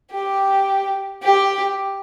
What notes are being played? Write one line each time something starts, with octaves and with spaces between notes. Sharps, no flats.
G4
G4